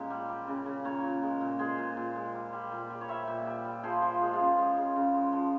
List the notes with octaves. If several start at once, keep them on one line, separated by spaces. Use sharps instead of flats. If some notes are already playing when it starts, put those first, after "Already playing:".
Already playing: A#2 G#3 C#4 F4 G4 A#4
G3
G3
C#3
C#3
A#2 A#4 C#5
A#2
G#3
A#2
G#3 G#4 C5
A#2
A#2
G#3
G3
G3
A#2
G3
C#5
G3 C5 E5
A#2
G3
G3
F3 G#4 C5
F3
G#3
F4 G#4
C#3
G#3
C#3
C#3
G#3
F3